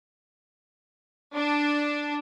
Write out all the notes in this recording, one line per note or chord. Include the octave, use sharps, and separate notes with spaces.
D4